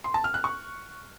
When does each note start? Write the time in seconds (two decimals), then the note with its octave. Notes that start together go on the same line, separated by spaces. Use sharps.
0.04 C6
0.14 A5
0.24 F6
0.34 F#6
0.44 C#6